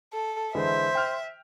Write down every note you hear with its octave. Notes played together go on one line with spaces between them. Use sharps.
A4
D3 E3 G#3 C5 E5
G5 F6